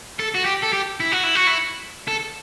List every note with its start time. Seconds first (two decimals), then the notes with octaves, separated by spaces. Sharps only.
0.20 A4
0.35 F#4
0.45 G4
0.63 A4
0.73 G4
1.00 E4
1.12 F#4
1.23 E4
1.35 F#4
1.47 E4
2.08 A4